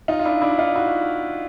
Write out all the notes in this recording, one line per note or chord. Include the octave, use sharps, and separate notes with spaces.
D#4 F4
F4
D4 E4
D4 E4
D#4 F4
E4 F#4